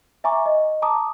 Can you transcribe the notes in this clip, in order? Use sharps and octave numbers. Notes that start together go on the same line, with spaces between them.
E5 G#5 A#5 C#6 D6
D#5
A5 A#5 D6 D#6